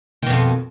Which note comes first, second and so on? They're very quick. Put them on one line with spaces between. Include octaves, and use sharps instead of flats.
D#3 B2 F2